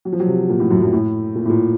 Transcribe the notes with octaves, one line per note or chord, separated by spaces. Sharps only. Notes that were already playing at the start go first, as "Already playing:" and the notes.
F#3
F3
F#3
C3
A#2
A2
F#2
F#2
A2
A#2
A2
A#2